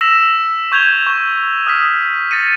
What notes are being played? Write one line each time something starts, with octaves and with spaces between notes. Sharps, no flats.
E6 A#6 B6 E7 F7
C#6 G6 G#6 F7 G7
C#6 G6
D#6 F6 B6
A6 A#6 C#7 D#7